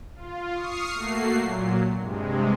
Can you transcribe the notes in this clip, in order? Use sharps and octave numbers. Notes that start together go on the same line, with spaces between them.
F4
C#6 D#6 F6 C7
A3 A#3 F#4 C7
A#2 F#3
G2 C3 G#3